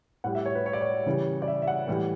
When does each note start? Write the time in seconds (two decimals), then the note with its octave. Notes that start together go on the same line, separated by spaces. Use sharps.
0.24 A2 G3 F#5
0.35 E5
0.46 C#5
0.55 B4
0.66 C#5
0.73 D5
0.81 C#5
1.06 C#3 E3 G3
1.42 D5
1.47 E5
1.62 E5
1.67 F#5
1.87 A2 E3 G3